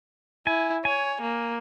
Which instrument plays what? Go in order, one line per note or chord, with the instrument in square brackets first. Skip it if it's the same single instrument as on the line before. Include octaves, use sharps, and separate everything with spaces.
[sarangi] E4 [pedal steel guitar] G#5
[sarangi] C#5 [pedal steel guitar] G#5
[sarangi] A#3